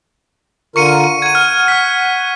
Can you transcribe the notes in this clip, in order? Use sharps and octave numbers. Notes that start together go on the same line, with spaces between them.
D3 F4 A#4 C#6 C#7 D#7
F#5 G#6 D#7
F6
F6 B6